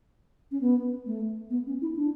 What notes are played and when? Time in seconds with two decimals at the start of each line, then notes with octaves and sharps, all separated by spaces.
0.51 C#4
0.61 B3
1.06 A3
1.50 B3
1.66 C#4
1.82 E4
1.96 D4